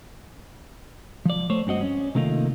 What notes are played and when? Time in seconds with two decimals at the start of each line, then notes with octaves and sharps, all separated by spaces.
1.26 F3 D5
1.50 A3 C5 C#5
1.67 G2 C4 F#4 D#5
1.81 C#4
2.15 C3 D#3 A3 A#3 D#4 F4